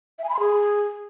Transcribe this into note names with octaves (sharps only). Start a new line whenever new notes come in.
E5
G#5
B5
C6
G#4